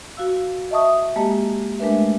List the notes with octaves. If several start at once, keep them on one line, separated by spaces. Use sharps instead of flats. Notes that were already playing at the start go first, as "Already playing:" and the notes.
F#4 F5 E6
D#5 E5 A5 C#6 D#6
G#3 A#3 G4 D#5 A5
G#3 A3 D4 A#4 B4 E5